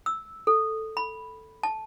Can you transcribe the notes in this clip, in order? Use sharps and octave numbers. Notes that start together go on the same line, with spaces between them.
E6
A4
B5
A5